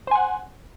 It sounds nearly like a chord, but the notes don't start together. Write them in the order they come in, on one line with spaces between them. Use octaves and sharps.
C5 G#5 F#5